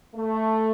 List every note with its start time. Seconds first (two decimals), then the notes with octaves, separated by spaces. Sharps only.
0.16 A3